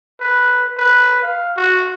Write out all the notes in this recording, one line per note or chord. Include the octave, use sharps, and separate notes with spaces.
B4
B4
F5
F#4